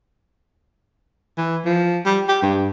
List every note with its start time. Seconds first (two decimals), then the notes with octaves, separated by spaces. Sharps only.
1.38 E3
1.65 F3
2.06 G3
2.29 G4
2.43 G2